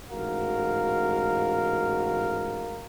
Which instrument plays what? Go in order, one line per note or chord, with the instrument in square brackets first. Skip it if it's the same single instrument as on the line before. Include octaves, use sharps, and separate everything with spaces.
[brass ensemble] A1 G#2 F#4 A#4 F5